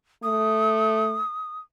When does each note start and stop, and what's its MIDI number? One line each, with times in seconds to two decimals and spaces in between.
0.23 1.20 57
0.23 1.59 87